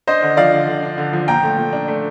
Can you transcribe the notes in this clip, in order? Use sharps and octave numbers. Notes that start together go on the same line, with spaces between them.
D4 C5 D#5
D3
F3 D5 F5
D3
D3
D4
D3
F3
A#2 G5 A#5
A3
A#2
D4
A3